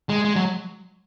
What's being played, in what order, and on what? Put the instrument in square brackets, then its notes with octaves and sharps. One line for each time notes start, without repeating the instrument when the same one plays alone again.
[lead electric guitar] G#3
G#3
F#3